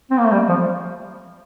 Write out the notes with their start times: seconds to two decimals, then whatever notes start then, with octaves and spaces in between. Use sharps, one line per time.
0.11 C4
0.18 A#3
0.25 A3
0.32 G3
0.49 F3